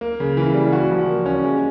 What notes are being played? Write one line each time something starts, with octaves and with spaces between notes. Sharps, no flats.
A#3
C#3
E3
G3
F#4
F3
A#3
C#4
G#3